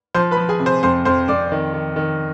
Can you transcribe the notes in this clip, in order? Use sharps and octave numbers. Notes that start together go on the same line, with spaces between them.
F3 C5 C6
B4 B5
F3
G#4 G#5
C3
C5 C6
F2 C5 C6
F2 C5 C6
F2 D5 D6
D#3
D#3
D#3